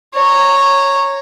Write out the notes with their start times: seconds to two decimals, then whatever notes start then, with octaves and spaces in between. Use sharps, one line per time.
0.14 C#5 A#5